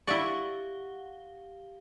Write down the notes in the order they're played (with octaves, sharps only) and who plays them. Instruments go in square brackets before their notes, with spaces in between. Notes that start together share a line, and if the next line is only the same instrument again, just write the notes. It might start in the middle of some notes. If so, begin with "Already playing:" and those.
[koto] E4 D5 [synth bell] G4 F5 G7 [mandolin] F#5 C#6